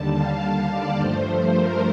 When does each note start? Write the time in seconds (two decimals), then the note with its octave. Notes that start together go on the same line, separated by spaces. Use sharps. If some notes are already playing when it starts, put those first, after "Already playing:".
Already playing: D#2 D3 G3 A5
0.14 F5
0.70 D5
0.97 G2 F3 A3 C5
1.54 A#4